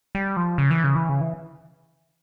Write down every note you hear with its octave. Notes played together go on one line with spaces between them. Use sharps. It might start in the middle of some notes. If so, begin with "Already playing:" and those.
G3
F3
C#3
E3
C#3
E3
C#3
E3